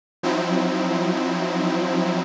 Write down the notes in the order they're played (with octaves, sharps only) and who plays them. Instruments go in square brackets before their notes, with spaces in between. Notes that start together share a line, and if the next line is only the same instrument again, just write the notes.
[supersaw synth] F3 F#3 C4 D#4 E4